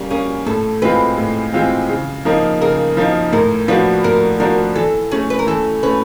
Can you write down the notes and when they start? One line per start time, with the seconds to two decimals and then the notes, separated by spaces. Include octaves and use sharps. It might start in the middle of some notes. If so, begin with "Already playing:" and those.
Already playing: G3 A#3 C#4
0.10 A#3 C#4 G#4
0.46 A2 A4
0.82 E3 G#3 C4 F4 B4
1.18 A2
1.53 E3 G#3 C4 F4
1.89 C#3
2.25 F3 A#3 D#4
2.61 C#3 A#4
2.97 F3 A#3 D#4
3.33 A2 A#4
3.68 F3 A#3 D4 F#4 B4
4.04 A2 A#4
4.40 F3 A#3 D4 F#4 A#4
4.76 E3 A4
5.11 A3 C#4 G#4
5.30 B4
5.39 A#4
5.47 E3 A4
5.83 A3 C#4 B4